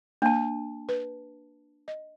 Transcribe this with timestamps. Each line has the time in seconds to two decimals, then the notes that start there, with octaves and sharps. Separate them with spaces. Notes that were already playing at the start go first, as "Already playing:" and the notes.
0.22 A#3 D4 A5
0.89 B4
1.88 D#5